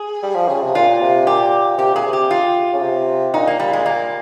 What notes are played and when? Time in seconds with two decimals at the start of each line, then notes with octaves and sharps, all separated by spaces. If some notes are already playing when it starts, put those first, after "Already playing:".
Already playing: G#4
0.23 G3
0.35 F3
0.49 C#3
0.62 C3
0.75 A#2 F4
1.01 C3
1.27 A#2 G4
1.78 C3 G4
1.93 A#2 G#4
2.06 C3
2.13 G4
2.31 F4
2.73 C#3
2.82 C3
3.34 A#2 D#4
3.47 A#3
3.60 G3
3.73 G#3
3.86 A#3